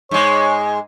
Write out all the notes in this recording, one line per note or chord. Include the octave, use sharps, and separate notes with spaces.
G#2 G#3 C#5